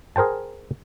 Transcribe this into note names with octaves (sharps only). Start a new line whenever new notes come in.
G#4 A#4 C5 G5 A5